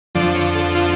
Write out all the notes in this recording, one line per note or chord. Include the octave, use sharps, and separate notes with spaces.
F2 D3 F3 D5
C#5
A4
F4